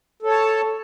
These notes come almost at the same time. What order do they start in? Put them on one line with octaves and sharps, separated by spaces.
A4 C#5 A5